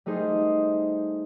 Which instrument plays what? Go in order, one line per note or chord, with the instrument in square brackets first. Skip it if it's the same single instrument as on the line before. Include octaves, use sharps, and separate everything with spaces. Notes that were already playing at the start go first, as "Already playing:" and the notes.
[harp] G3 A3 D#4 G#4 C5